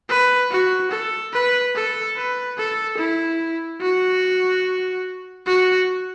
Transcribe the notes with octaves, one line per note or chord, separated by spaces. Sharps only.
B4
F#4
A4
B4
A4
B4
A4
E4
F#4
F#4